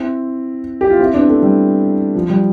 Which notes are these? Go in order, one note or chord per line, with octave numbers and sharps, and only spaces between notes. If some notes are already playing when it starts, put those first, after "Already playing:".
Already playing: C4 E4
G4
F4
C4 E4
B3 D4
A3 C4
G3
F3
G3